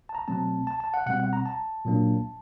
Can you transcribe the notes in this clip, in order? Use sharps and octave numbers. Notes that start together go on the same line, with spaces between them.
A5
A#5
B2 F#3 A3 C4 A5
A5
A5
F#5
B2 G3 C4 F#5
F#5
A#5
A5
A#2 F#3 A#3 D4